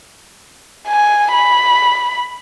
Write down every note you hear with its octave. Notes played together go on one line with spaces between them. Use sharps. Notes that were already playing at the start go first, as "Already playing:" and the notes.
G#5
B5